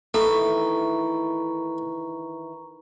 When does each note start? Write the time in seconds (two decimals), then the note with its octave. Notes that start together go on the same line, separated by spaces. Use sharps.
0.14 D#3 E3 A3 A4 A#5 C#6